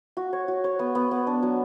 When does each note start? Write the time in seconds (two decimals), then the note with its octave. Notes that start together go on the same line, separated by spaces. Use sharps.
0.17 F#4
0.33 C#5
0.48 F#4
0.64 C#5
0.79 B3
0.95 B3
1.11 B3
1.27 D4
1.43 F#3